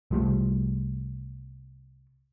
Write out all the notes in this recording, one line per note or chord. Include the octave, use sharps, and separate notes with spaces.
C2 F3 G3 A3